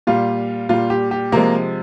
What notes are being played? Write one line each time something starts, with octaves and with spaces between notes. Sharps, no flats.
A#2 G3 F4
A#2 G3 F4
G4
G4
C3 F3 G#3 A#3 A#4